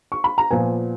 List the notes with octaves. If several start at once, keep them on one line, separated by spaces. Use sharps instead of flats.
C#6
B5
A#5
A#2 F3 B3 G#5